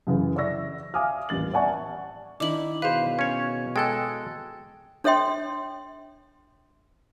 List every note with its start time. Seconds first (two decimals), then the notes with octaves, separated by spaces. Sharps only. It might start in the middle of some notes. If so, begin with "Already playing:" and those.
0.07 F#2 C#3 E3
0.36 D5 E5 C#6 E6 A#6
0.94 E5 F5 G#5 D6 D#6 F6
1.29 D#1 A1 A6 F#7
1.53 D5 E5 F#5 G#5 A5 C#6
2.40 D#3 D4 E4 D6 F#7
2.82 B2 G#4 B4 C5 F5
3.19 C#4 C#5
3.76 G#3 A4 G5 F#6
5.04 D4 A4 C#5 E5 G5 C6